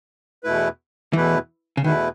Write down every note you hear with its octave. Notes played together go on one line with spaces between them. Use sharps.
E2 B2 A3 E4 B4
E2 B2 E3 A3 E4 B4
C#3
E2 B2 D#3 A3 E4 B4